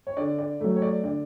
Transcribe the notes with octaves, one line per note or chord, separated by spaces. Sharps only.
C#5
D3 D5
D5
F#3 A3
C#5
D5
D3 D5